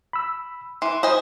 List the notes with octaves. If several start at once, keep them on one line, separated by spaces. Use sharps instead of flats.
B5 E6
E3 C6
C5 D#5 G#5 B5 D#6